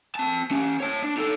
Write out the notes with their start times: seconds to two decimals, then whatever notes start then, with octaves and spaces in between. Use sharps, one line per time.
0.15 C4 A5
0.51 C#4 G4
0.80 C#5 A5
1.03 D4
1.17 D#4 A4